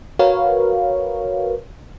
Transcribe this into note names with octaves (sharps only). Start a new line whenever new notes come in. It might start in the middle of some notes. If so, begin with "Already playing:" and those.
F#4 A#4 B4 C#5 F5